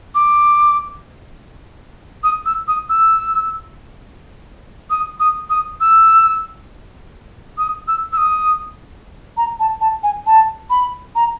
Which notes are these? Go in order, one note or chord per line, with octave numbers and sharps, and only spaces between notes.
D6
D#6
E6
D#6
E6
D#6
D#6
D#6
E6
D#6
E6
E6
D#6
A#5
A5
A5
G#5
A5
B5
A#5